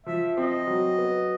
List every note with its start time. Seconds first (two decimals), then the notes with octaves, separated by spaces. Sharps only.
0.06 F3 E5
0.37 C4 D#5
0.67 F#3
0.98 B3